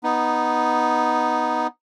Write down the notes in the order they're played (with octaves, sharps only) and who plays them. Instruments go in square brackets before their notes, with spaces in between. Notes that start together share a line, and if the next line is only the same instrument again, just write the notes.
[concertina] B3 D#4